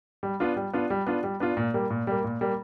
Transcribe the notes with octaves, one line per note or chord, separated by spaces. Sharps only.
G3
B3 D4 F4
G3
B3 D4 F4
G3
B3 D4 F4
G3
B3 D4 F4
A#2
G3 A#3
A#2
G3 A#3
A#2
G3 A#3